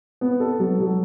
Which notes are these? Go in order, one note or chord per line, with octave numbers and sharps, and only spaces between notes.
B3
A4
F#3
F#3